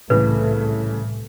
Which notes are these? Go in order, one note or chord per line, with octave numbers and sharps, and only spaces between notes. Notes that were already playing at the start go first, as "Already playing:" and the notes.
C2 A2 C#3 E3 A3 B4